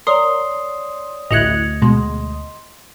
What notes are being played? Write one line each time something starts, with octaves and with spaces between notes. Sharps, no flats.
A#4 C#5 D5 C6 D#6
A1 D2 E4 D#5 F#6 G#6 C#7 F7
B2 G#3 C6